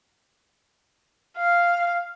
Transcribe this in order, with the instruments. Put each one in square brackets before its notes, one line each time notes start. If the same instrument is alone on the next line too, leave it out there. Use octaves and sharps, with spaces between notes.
[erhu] F5